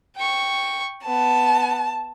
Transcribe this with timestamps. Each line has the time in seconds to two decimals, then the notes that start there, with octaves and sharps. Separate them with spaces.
0.16 G5 C#6
1.07 B3 A5